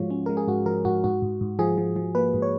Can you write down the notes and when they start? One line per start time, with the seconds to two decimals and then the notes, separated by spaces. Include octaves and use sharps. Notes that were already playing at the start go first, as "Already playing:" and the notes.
Already playing: G#2 F3 G#3 F4 F#4 C#5
0.10 C#4
0.26 G#3 A#4
0.37 G#4
0.48 G#2 F#4
0.66 F3 A#4
0.85 G#2 F#4
1.04 G#2 F#4
1.22 G#2
1.41 G#2
1.59 F3 G#4
1.78 F3
1.96 F3
2.15 A#3 B4
2.34 G#2
2.42 C#5